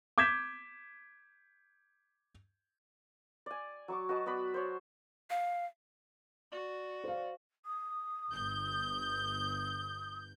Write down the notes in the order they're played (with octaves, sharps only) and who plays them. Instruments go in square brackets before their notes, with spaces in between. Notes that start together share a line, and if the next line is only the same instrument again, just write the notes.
[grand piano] D6 G6 G#6 B6 E7
[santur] D5 G#5
F#3 C#6 D6
F#4 B4 D#5 A5
B3 F#4 D5 B5
C5 C#5
[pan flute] F5
[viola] F#4 [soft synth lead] D5
[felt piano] C5 F5
[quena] D#6
[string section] G1 G6